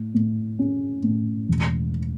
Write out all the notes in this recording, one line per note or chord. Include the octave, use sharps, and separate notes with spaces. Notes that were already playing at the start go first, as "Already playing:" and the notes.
Already playing: A2
A2
C#4
A2
E1